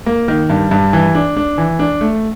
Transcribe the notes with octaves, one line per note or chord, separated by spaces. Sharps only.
A#3
D#3
G2
G2
E3
D4
D4
E3
D4
A3